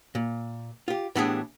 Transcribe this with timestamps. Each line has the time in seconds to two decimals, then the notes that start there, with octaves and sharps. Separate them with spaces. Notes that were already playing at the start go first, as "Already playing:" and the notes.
0.15 A#2
0.88 F4 G4
1.15 A2 E3 B3 D4 G4 G#4